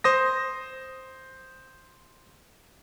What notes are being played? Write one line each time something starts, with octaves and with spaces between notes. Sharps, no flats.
C5 D#6 A#6